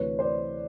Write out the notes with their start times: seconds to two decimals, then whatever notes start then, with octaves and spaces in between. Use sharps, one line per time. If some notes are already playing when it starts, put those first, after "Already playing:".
Already playing: D2 C3 E3 B4 C#5
0.19 C5 D5